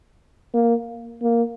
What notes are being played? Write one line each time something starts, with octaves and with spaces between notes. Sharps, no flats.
A#3
A#3